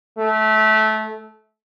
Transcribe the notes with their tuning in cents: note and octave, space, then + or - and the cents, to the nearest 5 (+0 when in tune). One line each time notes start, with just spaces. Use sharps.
A3 -20